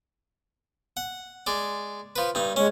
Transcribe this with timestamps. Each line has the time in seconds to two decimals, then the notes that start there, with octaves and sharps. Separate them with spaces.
0.97 F#5
1.47 G#3 D5
2.16 F3 B4
2.35 G2 D#4
2.56 G#3 C#4 C#5